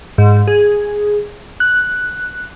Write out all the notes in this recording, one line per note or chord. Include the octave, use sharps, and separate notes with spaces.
G#2
G#4
F#6